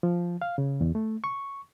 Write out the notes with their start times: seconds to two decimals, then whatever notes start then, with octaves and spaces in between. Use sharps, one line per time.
0.03 F3
0.42 F5
0.58 C#3
0.81 E2
0.95 A3
1.24 C#6